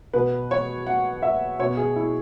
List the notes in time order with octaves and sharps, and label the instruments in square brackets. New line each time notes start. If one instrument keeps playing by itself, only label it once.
[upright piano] B2 B3 B4
C#5
F#5
E5
B2 B3 C#5
G#4
E4